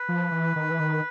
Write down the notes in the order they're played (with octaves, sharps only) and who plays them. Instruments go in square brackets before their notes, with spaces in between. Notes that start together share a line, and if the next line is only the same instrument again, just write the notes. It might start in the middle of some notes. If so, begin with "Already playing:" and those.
Already playing: [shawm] B4
[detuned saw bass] F3
E3
D#3
E3
D#3